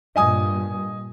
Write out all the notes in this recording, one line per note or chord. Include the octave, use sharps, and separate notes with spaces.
G2 A#2 D#5 G#5 D#6